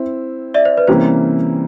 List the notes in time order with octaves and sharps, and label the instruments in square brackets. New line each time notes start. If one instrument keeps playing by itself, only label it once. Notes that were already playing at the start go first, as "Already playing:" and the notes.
Already playing: [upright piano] C4 E4
[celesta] D5 E5
C5
B4
[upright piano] C3 E3 G3 A#3 C#4 [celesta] C5